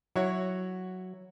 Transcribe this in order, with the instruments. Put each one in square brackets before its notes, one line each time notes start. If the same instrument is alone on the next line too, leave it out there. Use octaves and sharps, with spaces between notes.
[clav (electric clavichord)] F#3 [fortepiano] E4 F#4 C#5